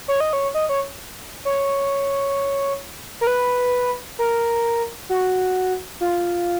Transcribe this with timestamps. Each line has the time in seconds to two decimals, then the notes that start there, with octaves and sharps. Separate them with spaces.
0.08 C#5
0.20 D#5
0.33 C#5
0.54 D#5
0.69 C#5
1.45 C#5
3.21 A#4
3.27 B4
4.19 A#4
5.09 F#4
6.01 F4